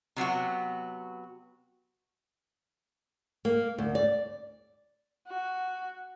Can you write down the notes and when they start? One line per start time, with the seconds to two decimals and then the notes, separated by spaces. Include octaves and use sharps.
0.16 C3 F#3 B3 F#4
3.45 A#3
3.78 D2
3.95 D5
5.28 F#4